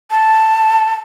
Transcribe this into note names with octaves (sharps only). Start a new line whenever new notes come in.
A5